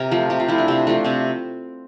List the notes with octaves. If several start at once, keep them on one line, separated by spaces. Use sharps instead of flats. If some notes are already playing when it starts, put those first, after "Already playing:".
Already playing: C3 A#4
F3 A3
C3 G4
F4
F3 A3 E4
D4
C3 C4
F3 A3 D4
C3 C4